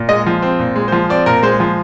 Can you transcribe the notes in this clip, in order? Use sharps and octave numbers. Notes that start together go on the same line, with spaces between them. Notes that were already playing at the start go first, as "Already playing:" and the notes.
Already playing: A#2
G#3 D#5
F3
C4
A#2
G#3
F3 C5
C4 D5
A#2 A#4
G#3 C5
F3